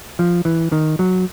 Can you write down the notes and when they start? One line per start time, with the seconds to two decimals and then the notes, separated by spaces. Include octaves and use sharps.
0.19 F3
0.45 E3
0.72 D#3
0.99 F#3